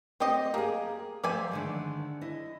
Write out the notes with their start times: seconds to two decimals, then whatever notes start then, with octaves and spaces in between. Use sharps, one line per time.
0.20 A3 C4 G4 D#5
0.54 A#3 G4 G#4
1.24 F3 A3 D5 E5 G#5
1.51 D3 D#3 G#3
2.21 E4 D#5